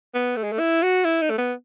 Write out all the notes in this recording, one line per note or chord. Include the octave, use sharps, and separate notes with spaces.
B3
A3
G#3
A3
E4
F#4
E4
D#4
A3
B3